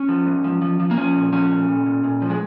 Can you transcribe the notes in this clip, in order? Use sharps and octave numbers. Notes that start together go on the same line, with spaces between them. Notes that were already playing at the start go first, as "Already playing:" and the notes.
Already playing: C#4
F3
G#2
F3
F3
F3
A#3
F3 C#4
A#2
F3 C#4
A#2
A#2
A#2
A#2
F3
G#3